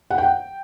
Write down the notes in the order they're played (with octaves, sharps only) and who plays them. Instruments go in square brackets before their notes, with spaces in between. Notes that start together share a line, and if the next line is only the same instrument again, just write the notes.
[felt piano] F#5
G5